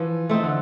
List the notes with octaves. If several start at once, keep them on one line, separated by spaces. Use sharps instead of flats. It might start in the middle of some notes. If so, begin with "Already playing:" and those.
Already playing: E3 F3
A3 C4 D#4
D3